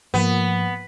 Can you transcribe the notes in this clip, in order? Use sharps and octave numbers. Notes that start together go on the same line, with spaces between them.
G#2 F3 A#3 B3